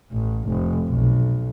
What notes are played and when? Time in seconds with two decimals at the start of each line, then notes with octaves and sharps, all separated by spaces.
0.12 A1
0.49 F1
0.89 B1